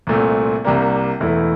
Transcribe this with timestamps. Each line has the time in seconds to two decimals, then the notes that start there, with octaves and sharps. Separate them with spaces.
0.07 C2 A#2 A3 C4
0.64 C2 C3 G3 A#3 D4
1.20 E1 E2 E3 A3 E4